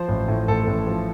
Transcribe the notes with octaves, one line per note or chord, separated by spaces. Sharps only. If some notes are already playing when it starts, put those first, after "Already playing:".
Already playing: F3 C5
A1
A2
A1 A4
A1
F3